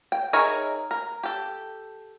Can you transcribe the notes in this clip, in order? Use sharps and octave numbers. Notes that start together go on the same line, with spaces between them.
G5
D#4 G#4 A#4 C#5 E5
A#4
G4 A4